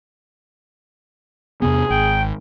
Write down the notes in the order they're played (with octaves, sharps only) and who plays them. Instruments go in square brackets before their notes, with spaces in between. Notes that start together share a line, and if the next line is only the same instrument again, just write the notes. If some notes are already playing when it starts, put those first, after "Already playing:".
[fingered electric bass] E2 C3 B3 [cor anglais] G#4
[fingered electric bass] G#1 [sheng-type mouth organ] G5